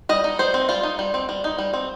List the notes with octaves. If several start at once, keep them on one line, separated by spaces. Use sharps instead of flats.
G3 D#5
D#4
G3 C5
C4
G3 F4
D#4
G3
C4
G3
D#4
G3
C4